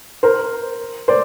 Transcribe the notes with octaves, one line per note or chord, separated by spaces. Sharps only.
A#4 C5
C5 D5